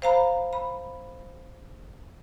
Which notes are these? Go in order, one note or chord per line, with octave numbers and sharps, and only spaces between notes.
C5 F5 A#5 B5
B5